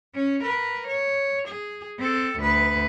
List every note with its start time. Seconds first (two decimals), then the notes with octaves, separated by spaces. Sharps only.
0.15 C#4
0.43 A#4 B4
0.88 C#5
1.48 G#4
1.99 C4 A4
2.39 D2 B4